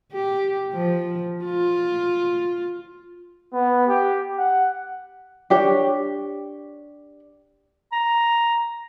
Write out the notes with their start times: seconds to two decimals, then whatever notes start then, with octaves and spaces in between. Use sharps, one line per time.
0.13 G4
0.73 F3
1.45 F4
3.54 B3
3.88 G4
4.38 F#5
5.50 D4 G4 C#5
7.92 A#5